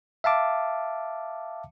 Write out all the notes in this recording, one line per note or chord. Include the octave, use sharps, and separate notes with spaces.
E5 F5 A5 D6